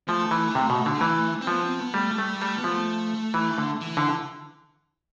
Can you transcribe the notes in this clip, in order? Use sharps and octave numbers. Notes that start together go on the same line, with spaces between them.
F3 A3
E3
C3
B2
D3
E3
C4
F3 B3
C4
B3
G3 A3
G3 A3
G3 A3
B3
F3
A3
E3
D3
E3
D3